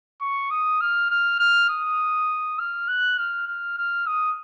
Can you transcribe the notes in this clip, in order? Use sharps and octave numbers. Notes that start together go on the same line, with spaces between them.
C#6
D#6
F6
F6
F6
D#6
F6
F#6
F6
F6
F6
D#6